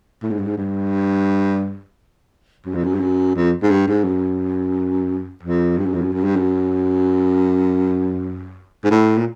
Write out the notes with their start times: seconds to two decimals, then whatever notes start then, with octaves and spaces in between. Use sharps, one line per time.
0.23 A2
0.31 G#2
0.39 G2
0.47 G#2
0.58 G2
2.66 F#2
2.75 F2
2.84 F#2
2.95 G2
3.00 F#2
3.36 F2
3.63 G#2
3.70 G2
3.87 G#2
4.04 F#2
5.43 F2
5.78 G2
5.86 F#2
5.94 F2
6.02 F#2
6.13 F#2
6.24 G2
6.36 F#2
8.84 G#2
8.91 A2
9.18 A#2